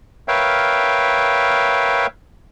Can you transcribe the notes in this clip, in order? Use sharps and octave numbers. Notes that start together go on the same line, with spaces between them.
A#4 B4 C#5 E5 F5 G5